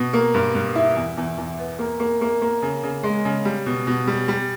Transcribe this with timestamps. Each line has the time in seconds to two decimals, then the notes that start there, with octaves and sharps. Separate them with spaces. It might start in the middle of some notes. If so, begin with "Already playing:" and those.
Already playing: B2
0.13 A#3
0.34 G2
0.55 G2
0.76 E4
0.96 E2
1.17 E2
1.38 E2
1.59 B3
1.79 A#3
2.00 A#3
2.21 A#3
2.42 A#3
2.62 C#3
2.83 C#3
3.03 G#3
3.25 C#3
3.45 G3
3.66 B2
3.87 B2
4.07 G3
4.28 G3